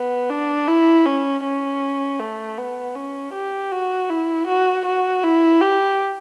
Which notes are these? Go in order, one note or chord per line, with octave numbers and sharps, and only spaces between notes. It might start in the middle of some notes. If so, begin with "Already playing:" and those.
Already playing: B3
D4
E4
C#4
C#4
A3
B3
C#4
G4
F#4
E4
F#4
F#4
E4
G4